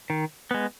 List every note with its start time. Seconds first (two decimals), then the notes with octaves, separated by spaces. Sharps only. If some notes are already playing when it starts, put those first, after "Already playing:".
0.10 D#3
0.51 G#3 B3